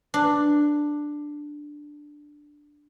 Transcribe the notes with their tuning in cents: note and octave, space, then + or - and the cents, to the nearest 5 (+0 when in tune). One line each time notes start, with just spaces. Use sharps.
D4 +5